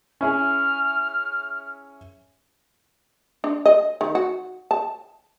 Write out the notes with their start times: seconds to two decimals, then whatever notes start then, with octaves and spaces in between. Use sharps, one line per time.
0.21 C#4 E4 G#4 F6
3.44 D4
3.66 D#5
4.01 D#3
4.15 F#4
4.71 A5